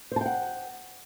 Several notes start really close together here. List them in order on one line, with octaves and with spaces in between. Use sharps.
C5 A5 G5 F#5